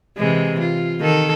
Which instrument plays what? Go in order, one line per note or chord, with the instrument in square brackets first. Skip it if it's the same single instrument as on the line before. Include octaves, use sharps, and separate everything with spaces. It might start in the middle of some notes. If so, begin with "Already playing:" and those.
[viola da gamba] C3 E3 G#3
F4
D#3 A4